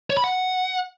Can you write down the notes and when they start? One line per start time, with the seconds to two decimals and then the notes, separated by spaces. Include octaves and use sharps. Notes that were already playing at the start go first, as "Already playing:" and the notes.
0.10 C#5
0.17 B5
0.24 F#5